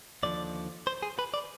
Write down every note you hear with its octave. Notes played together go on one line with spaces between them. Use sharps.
D#2 D3 F3 D5
C5
G#4
B4
D5